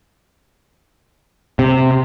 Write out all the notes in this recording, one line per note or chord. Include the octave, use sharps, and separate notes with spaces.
C3